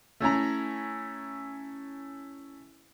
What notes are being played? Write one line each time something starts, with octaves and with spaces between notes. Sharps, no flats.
A3 C#4 E4 A#5